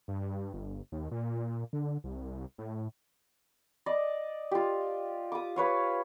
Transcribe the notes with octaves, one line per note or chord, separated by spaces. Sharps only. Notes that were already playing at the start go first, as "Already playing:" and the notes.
G2
G1
D#2
A#2
D3
C2
A2
D5 D#5
F4 G4
D6 D#6
B4 C#5 F5